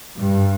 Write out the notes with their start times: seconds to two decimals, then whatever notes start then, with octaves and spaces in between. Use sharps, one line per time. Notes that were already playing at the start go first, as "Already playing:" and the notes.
0.16 G2